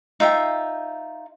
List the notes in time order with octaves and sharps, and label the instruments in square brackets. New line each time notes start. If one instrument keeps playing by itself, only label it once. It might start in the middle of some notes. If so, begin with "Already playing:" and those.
[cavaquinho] D#4 F4 E5 G5